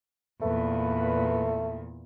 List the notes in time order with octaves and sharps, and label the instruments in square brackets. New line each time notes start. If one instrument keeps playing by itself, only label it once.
[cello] E2 A#2 [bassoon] A3 [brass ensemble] A#3 B4